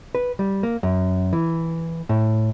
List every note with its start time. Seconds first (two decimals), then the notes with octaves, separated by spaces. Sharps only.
0.15 B4
0.39 G3
0.63 A#3
0.83 F#2
1.33 E3
2.09 A2